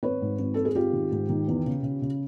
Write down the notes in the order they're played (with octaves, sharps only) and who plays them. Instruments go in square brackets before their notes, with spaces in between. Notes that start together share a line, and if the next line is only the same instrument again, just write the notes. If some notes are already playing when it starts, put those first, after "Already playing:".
[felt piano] G#1 B4 C#5
G#2
G#1
G#1 A4
G#4
G#1 F4 G4
D#3
G#2
D#3
E2
C#3
C#3
C#3